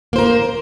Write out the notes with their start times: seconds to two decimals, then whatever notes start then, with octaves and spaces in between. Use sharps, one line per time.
0.13 A#3
0.16 C5
0.18 A#4